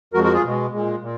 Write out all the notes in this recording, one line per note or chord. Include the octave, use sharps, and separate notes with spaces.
F2 F3 G#3 F#4 A#4
F#4 A#4
F4 G#4
B2 G#3
A#2 G#3
A#2